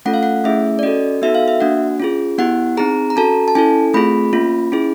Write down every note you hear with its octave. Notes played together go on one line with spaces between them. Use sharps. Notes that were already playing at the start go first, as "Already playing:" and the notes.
A3 C#4 F4 A4 F#5
F5
F#5
A3 C#4 E4 G#4 E5
D5
C#4 F#4 A4 D#5
B3 D#4 F#4 A4 E5
F5
E5
A#3 D4 F#4 F#5
C#4 F4 G#4
B3 E4 G4 F#5
C4 D#4 G#4 A#5
A#5
C#4 F#4 A4 A5
A5
C#4 E4 A4 G#5
A3 C4 F4 G#4 B5
A#3 C#4 F4
C#4 E4 G#4